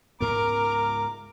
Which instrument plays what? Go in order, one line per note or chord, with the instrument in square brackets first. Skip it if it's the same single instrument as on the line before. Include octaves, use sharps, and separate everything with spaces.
[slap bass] C#2 G#2 B3 [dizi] A#4 [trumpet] A#5 [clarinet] D6